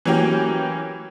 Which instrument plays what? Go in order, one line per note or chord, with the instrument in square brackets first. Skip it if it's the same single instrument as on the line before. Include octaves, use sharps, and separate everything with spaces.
[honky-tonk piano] E3 F#3 A#3 C#4 G4